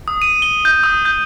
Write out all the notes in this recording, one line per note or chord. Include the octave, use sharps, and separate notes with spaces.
D#6
D#7
G7
G6
D#6
G6